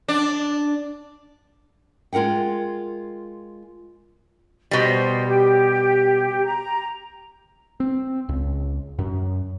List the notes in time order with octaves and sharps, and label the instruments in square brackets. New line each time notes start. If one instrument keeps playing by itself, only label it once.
[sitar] D4
[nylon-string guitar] G#3 F4 A#4 F#5 G5
[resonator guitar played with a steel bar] B2 G3 [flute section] C5
[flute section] G4
A#5
[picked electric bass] C4
C#2
F#2